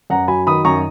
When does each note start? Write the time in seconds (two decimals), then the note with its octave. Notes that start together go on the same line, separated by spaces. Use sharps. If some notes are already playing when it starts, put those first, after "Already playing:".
0.10 F#2 F#5 A#5
0.28 F#3 G#5 B5
0.47 D#3 B5 D#6
0.65 F#2 A#5 C#6